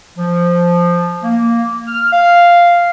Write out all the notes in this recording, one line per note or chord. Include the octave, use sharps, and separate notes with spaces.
F3
A#3
F6
F5